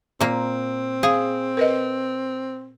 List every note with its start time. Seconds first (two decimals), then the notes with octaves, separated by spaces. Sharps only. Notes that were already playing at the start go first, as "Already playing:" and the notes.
0.21 A#2 A#3 C4
1.03 G#4 F5
1.57 A#4 B4 D#5